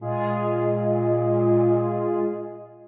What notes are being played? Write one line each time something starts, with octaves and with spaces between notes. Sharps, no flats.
A#2 G#3 F4 G#4 D#5